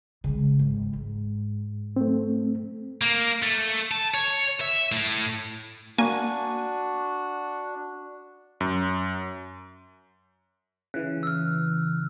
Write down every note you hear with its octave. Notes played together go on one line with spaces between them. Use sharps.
C#3 G#3
G#1
G#2
A3 C4
A#3
A3
A5
C#5
E5
A2
A#3 D4 F#4 G#5
F#2
C#3 E3 F#6
E6 F6